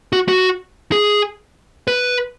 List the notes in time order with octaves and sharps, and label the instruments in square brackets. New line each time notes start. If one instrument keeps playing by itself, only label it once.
[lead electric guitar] F#4
F#4
G#4
B4